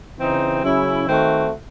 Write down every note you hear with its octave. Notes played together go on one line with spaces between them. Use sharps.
C#3 E3 C4 D#4
C#3 F#3 C#4 E4
D#3 A3 C4 F#4